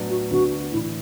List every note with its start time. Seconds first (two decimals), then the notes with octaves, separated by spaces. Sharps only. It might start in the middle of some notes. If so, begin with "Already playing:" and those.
Already playing: A2 F#3 B3 D4
0.10 F#4
0.31 D2 D3 B3 D4 F#4
0.72 A2 E3 D4 E4